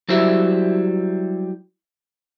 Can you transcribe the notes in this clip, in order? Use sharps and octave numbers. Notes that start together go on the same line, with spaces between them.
F#3 G3 E4 C5 E5